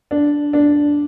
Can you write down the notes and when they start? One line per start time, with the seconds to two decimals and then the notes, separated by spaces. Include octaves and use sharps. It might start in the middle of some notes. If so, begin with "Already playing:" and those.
0.11 D4
0.53 D4